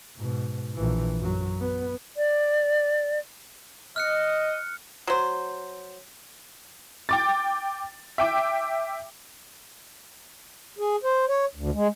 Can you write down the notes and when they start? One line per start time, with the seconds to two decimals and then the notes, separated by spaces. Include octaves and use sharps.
0.17 G#2 B2
0.75 A#1 E3
1.19 F#2 F#3
1.60 B3
2.17 D5
3.96 D#5 F6 F#6 C#7
5.07 F#3 C5
7.09 G5 D6 A6
8.18 E5 G5 D6
10.79 G#4
11.04 C5
11.29 C#5
11.55 D2
11.74 G#3